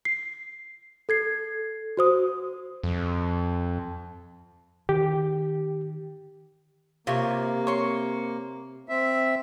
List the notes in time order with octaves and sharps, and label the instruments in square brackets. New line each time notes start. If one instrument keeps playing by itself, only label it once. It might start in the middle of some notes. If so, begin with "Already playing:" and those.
[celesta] C7
A4 G#6 C7
F#4 C5 D#6
[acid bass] F2
[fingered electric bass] D#3 [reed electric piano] G4
[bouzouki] C3 [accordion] A#3 [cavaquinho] F4 C#5
[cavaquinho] C#5 C6
[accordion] C4 E5